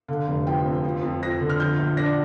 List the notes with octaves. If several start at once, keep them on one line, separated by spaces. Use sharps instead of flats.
D3 F5
F1
F3 G5
F2
F3
F2
F2 A#6
D3
F6
F3 G6
A#1
D4 A#6